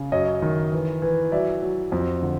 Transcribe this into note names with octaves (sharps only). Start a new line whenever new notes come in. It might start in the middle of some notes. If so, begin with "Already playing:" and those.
Already playing: C#3
F#2 C#5 D#5
D#3
E3
E3
F#3 D5 E5
F#3
F2
D3